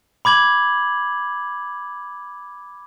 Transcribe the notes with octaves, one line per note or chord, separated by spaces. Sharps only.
B5 D6 G#6 F#7